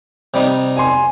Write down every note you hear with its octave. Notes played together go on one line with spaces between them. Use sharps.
C3 G3 D#4
G#5 C6